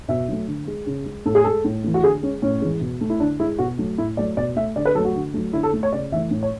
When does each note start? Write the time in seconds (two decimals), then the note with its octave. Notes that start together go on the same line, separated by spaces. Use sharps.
0.09 B2 E5
0.28 F#3 A3
0.47 D3
0.67 G#3
0.87 C#3
1.06 G#3
1.26 A2 A4
1.35 G#4
1.44 G#3 A4
1.65 A2
1.84 E3 A3
1.94 F#4
2.03 D3 G#4
2.22 G#3 C#4
2.42 A2 C#4
2.61 E3 G#3
2.81 B2
3.01 A3
3.10 E4
3.20 D3 D4
3.40 G#3 E4
3.59 B2 F#4
3.78 F#3 A3
3.98 A2 E4
4.17 F#3 A3 D5
4.37 B2 D5
4.56 A3 E5
4.76 D3 D5
4.85 B4
4.95 F#3 A3 A4
5.05 F#4
5.15 D3
5.34 F#3 A3
5.53 D3 E4
5.63 A4
5.73 A3
5.83 C#5
5.92 C#3 D5
6.12 E3 E5
6.15 A3
6.31 A2
6.43 C#5